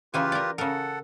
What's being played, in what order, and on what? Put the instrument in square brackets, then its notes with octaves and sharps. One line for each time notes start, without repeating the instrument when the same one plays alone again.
[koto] C#3 E3 G#5 [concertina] F4 G4 B4
[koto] A#4 D5
[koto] C#3 A#4 [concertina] A4 F#5